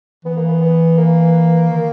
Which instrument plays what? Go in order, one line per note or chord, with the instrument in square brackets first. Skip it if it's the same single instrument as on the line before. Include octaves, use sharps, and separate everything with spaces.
[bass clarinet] E3 [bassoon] B3
[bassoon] A#3
B3
B3
A#3
[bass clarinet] D#3